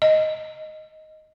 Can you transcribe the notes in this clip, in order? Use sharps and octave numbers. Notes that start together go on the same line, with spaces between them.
D#5